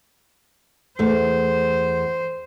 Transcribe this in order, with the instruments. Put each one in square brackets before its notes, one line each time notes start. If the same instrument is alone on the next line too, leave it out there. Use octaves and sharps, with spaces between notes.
[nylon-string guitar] E2 A3 [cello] C5